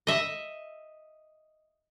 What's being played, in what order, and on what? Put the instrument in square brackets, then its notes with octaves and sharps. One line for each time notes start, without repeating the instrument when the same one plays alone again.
[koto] D#5 E5